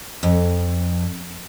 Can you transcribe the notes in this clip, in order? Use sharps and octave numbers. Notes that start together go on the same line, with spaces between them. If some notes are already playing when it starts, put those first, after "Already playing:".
F2